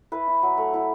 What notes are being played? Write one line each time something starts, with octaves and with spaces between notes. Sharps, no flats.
E4 B4
E4
F#3
A3
E4